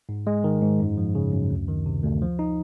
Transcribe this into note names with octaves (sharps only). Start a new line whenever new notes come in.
G#2
G#3
D#3
G#2
F#2
F3
C#3
F#2
D2
D#3
C3
D2
F3
D#4